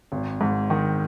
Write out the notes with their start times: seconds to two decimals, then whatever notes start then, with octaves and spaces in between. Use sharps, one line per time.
0.12 G#1
0.41 G#2
0.70 D#3